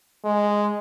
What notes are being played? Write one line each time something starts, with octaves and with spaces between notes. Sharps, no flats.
G#3